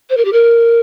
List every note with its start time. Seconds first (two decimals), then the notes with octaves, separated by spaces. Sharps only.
0.10 C5
0.17 A#4
0.25 G4
0.33 A#4